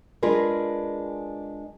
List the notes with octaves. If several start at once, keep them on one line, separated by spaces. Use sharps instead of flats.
G#3 D4 F4 G#4 A#4 B4